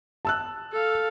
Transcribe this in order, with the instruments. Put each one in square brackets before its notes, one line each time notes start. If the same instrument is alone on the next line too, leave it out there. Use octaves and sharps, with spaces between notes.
[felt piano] A5 E6 F#6
[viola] A4 F5